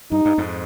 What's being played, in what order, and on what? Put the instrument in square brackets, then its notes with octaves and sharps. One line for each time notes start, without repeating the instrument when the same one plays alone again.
[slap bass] G2 [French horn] D#4
[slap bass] G2
F2 G#2